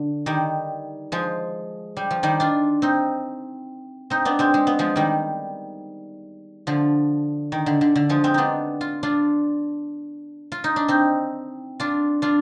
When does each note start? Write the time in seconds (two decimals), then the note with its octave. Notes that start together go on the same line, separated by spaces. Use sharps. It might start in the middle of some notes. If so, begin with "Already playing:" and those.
Already playing: D3
0.26 D#3 G3
1.12 F3 G#3
1.97 G3
2.11 F3
2.23 D#3 G3
2.40 D4 F4
2.82 C4 D#4
4.10 C4 D#4
4.25 B3 D4
4.39 G#3 C4
4.54 G#3
4.67 B3
4.79 F3 G#3
4.96 D#3 G3
6.67 D3 F3
7.52 D#3
7.66 D3
7.81 D3
7.96 D3
8.09 F3 G#3
8.24 G#3 C4
8.34 B3 D4 D#4
8.81 F4
9.03 D4 F4
10.52 F4
10.64 D#4
10.76 D4
10.88 C4 D#4
11.80 D4 F4
12.22 D4 F4